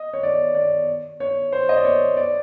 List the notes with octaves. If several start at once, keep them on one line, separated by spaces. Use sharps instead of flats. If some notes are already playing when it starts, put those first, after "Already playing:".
Already playing: D#5
C#5
D5
D5
C#5
C5
D#5
D5
C#5
D5